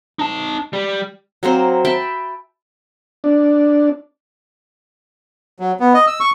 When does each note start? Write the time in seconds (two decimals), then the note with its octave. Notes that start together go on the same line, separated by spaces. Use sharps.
0.19 D#4 A5
0.73 G3
1.43 F#3 A#3 C4 C5
1.85 E5 G5 A5 B5
3.24 D4
5.60 F#3
5.80 B3
5.94 D#5
6.07 E6
6.20 C#6